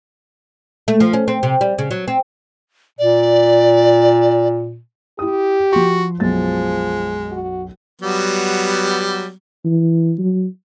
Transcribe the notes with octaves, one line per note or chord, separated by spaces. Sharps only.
A3
F3
C#4
C4
C3
G3
C#3
F#3
C4
A#2 D5
E4 G4 D#6
F3 F#4 C6
B1 F#2 F3 G#3 A6
F#4
F#3 G3 B3
E3
F#3